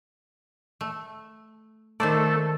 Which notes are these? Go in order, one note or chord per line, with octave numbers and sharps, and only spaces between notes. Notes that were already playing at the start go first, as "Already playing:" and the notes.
A3
D#3 A3 C5 D5